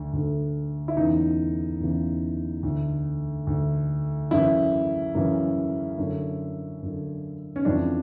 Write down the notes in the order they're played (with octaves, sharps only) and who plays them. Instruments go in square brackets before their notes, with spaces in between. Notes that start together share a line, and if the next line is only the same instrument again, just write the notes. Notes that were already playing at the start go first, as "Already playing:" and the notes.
Already playing: [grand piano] D2 D3
D2 D3
E4
E2 C#3 E3 D#4
E2 C#3 E3
D2 D3
D2 D3
F#2 C#3 E3 E4
F#2 C#3 E3
F#2 D3
F#2 D3
C#4
F2 C#3 E3 D4